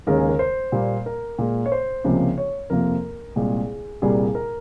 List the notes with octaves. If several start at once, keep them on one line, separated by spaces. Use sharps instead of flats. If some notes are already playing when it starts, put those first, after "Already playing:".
D#2 C#3 G#3 A#4
G#4
A#4
C5
A#2 G3 A#3
A#4
A#2 G#3
C#5
C5
C#2 C3 F3 A#3
C#5
F2 C3 F3 A#3 A#4
C2 A#2 G#3 G#4
C2 A#2 G3 A#3 G#4
A#4